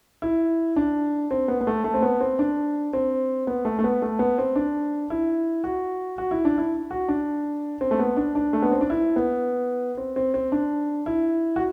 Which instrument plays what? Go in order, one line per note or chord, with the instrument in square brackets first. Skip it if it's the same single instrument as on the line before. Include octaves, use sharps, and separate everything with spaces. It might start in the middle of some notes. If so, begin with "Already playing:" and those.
[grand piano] E4
D4
C4
B3
B3
A3
A3
C4
B3
C4
D4
C4
B3
A3
A3
B3
A3
B3
C4
D4
E4
F#4
F#4
E4
D4
E4
F#4
D4
C4
A3
B3
D4
D4
A3
B3
C4
D4
E4
B3
C4
C4
C4
D4
E4
F#4